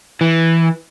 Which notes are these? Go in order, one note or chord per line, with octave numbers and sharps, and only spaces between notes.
E3